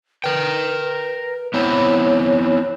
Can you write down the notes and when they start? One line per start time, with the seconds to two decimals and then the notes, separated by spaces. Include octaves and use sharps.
0.24 A#4 B4 G5
1.54 B3 C4 E4 C#5